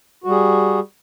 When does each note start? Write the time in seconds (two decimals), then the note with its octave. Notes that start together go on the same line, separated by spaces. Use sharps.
0.24 F#4
0.27 G3
0.30 G#4